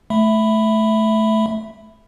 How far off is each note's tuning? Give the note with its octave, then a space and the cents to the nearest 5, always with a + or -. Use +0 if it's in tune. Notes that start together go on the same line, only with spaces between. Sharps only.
A3 -15 E5 +0 B5 +10